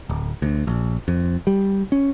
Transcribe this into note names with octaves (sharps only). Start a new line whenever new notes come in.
D1
D2
A#1
F2
G3
C#4